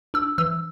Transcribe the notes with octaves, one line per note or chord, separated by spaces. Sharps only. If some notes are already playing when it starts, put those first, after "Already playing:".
D4 E6
E3 E6